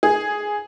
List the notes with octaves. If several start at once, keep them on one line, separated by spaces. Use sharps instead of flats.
G#4